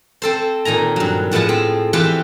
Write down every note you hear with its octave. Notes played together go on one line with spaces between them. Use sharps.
C4 A4 C5
A#2 D#3 G#5 A#5
G2 F#3
A2 F3 G#3 B3 A5
C4
E3 B3 C4 F4 G4 B4